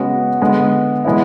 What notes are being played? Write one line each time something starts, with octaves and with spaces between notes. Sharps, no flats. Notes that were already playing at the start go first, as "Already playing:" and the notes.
Already playing: C#3 G#3 B3 F#4
D3 G#3 B3
E3 G#3 B3 E4